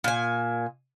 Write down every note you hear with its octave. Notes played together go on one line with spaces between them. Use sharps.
A#2 G#5